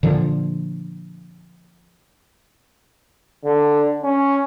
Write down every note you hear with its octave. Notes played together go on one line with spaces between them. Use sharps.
A#2 D3 F3
D3
C#4